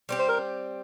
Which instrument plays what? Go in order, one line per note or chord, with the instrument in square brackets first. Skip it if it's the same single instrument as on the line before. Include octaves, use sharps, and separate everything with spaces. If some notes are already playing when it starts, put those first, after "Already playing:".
[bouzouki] G3 C4 G4
[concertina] C5
A#4